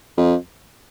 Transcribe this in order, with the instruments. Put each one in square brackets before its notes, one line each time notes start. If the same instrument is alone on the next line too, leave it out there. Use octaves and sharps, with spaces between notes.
[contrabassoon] F2